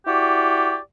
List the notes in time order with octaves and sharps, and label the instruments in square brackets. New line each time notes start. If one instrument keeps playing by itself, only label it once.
[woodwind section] E4 F#4 G4 D5